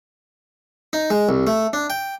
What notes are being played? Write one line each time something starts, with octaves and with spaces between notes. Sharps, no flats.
D#4
G#3
C2
A3
D4
G5